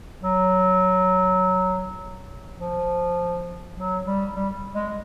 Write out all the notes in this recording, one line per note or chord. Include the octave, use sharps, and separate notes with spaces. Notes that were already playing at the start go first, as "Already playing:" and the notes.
F#3
F3
F#3
G3
G3
G#3